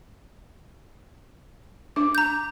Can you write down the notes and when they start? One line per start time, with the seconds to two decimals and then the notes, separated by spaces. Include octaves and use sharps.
1.96 D4 D6
2.15 A#5 G6